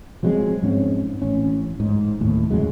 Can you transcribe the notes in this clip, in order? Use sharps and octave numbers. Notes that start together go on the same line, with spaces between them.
F3 F#3 G#3 C4
G#2 C4 C#4
A1 C#4
G#2
D#2 A2
F2 C#3 F#3 G#3